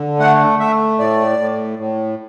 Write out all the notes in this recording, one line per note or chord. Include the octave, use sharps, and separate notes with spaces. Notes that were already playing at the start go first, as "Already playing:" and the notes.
Already playing: D3
A3 F#5
A3 E5
A2 D5
A2
A2